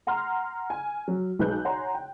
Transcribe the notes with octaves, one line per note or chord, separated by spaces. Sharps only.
F#5 A#5 C6 F6
G#5
F#3
B1 G#3 B4 F#6 G6
C#5 F#5 G#5 A#5 C6
G5